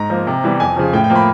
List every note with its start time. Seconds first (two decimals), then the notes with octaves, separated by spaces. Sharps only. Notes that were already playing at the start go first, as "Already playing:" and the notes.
Already playing: G#2 A#5
0.10 F3 A#3
0.27 C3
0.44 E3 G3 B3
0.60 F2 G#5
0.76 C#3 F3
0.93 A2 G5
1.04 G5
1.10 F3 A#3
1.16 B5